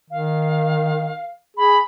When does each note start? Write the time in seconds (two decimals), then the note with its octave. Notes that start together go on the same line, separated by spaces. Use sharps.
0.11 D#3 F5
1.57 G#4 B5